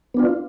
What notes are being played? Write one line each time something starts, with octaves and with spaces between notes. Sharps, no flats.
B3 D4 F4